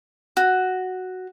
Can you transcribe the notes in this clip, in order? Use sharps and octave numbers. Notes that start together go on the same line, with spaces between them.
F#4